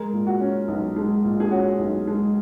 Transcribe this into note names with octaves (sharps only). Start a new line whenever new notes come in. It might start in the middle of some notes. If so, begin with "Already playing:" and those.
Already playing: G#3 A#4
A#2
F#4
C#4
B1
G#3
A#2
G#4
C#4 F#4
B1
G#3